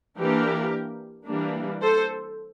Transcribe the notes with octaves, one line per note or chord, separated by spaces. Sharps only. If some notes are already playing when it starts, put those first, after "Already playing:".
E3 A#3 D4 G4 A#4
E3 G3 A#3 D4
A4 C5